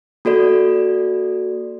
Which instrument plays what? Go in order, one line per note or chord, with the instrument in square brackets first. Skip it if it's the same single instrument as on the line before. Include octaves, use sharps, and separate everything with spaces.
[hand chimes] A#3 F#4 A4 D5